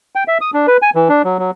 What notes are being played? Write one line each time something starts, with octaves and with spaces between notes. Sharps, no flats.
G5
E5
D#6
D4
B4
G#5
E3
D4
F#3
F#3